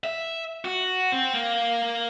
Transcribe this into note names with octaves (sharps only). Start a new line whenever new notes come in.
E5
F#4
C4
A#3